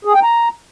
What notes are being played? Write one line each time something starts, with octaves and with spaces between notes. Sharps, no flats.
G#4
G5
A#5